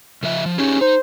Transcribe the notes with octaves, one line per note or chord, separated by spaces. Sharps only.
C#3 F3 E5
F3
C#4 D#4 G4 G#4
D#4 C5